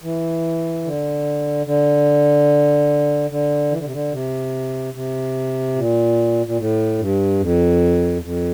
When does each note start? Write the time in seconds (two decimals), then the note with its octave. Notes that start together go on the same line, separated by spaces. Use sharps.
0.03 E3
0.84 D3
1.66 D3
3.30 D3
3.71 E3
3.78 D3
3.85 C3
3.92 D3
4.12 C3
4.94 C3
5.76 A#2
6.46 A#2
6.58 A2
6.98 G2
7.40 F2
8.17 E2
8.22 F2